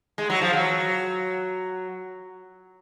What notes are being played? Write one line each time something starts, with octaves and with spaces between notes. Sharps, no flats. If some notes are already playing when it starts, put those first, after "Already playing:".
G#3
F#3
F3
F#3